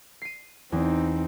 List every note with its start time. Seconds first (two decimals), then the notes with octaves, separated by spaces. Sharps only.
0.22 C7 D#7
0.72 E2 C4 D#4